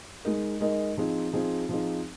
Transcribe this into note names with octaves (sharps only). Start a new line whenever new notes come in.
G#3 D#4 A#4 D#5
G#3 D#4 A#4 D#5
F3 C4 D#4 G#4
F3 C4 D#4 G#4
F3 C4 D#4 G#4